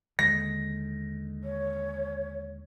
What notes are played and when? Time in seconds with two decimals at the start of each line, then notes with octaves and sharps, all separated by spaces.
0.19 D#2 D3 G#3 A#6
1.44 C#5